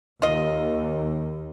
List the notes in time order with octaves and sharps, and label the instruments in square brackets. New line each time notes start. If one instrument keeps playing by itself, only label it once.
[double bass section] D#2 [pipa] F4 D#5